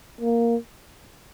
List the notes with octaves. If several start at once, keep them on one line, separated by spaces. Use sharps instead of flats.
A#3